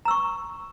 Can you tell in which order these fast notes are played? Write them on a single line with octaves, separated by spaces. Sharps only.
A#5 E6 C#6